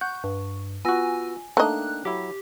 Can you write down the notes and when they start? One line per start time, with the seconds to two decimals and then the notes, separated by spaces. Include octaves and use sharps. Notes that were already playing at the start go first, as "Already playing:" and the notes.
0.01 F#5 C#6 G6
0.24 G2
0.85 B3 F4 F#4 G#5 E6 A#6
1.57 A3 A#3 D4 D#4 D#5 G5 F#6
2.05 F#3 E4 G4